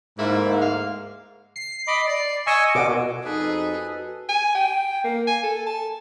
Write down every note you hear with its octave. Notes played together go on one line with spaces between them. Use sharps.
D2 G#2 A3 A#3 E4
F5
C7
D#5 B5 D6
D5
D#5 G#5 C#6 E6
B2 D6
F2 B2 D#4 G#4 A4 B4
G#5
G5
A#3
G#5
A4
A5